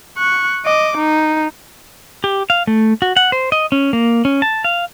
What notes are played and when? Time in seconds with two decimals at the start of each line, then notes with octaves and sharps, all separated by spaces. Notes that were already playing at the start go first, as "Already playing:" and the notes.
0.18 C#6 F#6
0.65 D#5 D6
0.97 D#4
2.24 G4
2.50 F5
2.67 A3
3.02 F#4
3.17 F#5
3.32 C5
3.52 D#5
3.72 C#4
3.93 A#3
4.25 C#4
4.42 A5
4.64 F5